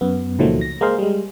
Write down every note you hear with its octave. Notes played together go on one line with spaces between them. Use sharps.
F#2 B3
C#2 A#2 D#3 F3 F#3 A3
A#6
G#3 A#3 G#4 A#4 C5 F5
G3 G#3